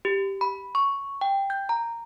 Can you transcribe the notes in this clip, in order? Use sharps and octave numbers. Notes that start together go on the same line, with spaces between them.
G4
B5
C#6
G5
G6
A#5